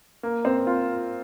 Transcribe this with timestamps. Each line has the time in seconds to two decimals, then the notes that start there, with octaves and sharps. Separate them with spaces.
0.23 A#3
0.45 C4
0.67 F4